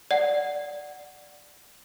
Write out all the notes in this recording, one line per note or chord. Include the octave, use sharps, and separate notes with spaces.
D5 F#5